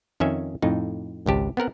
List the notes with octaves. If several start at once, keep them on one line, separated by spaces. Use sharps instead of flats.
F2 D#3 C#4 E5 G#5
F2 A2 D#4
G#1 C#2 G4 A5
B3 C4 A#4 F#5